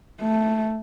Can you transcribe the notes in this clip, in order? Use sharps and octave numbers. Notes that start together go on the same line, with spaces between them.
A3